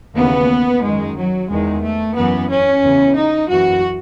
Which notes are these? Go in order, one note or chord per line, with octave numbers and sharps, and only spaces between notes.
D#2 C#3 E3 B3
F#2 D#3 G#3
F#3
E2 D#3 G#3
A3
F#2 E3 B3
C#4
E2 C#3 E3
D#4
F#2 E3 F#4